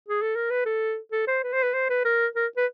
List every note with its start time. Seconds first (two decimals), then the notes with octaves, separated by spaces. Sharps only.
0.09 G#4
0.22 A4
0.36 A#4
0.50 B4
0.65 A4
1.12 A4
1.27 C5
1.43 B4
1.53 C5
1.63 B4
1.74 C5
1.90 B4
2.05 A#4
2.36 A#4
2.57 B4